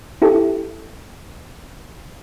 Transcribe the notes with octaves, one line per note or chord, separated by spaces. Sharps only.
E4 G4 A4